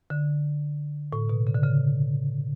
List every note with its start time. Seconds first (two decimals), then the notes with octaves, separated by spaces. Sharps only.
0.10 D3
1.13 A2
1.29 B2
1.47 C#3
1.55 D3
1.64 C#3